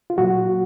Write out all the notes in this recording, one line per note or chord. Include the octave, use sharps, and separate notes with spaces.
F4
A#2 F#3 F#4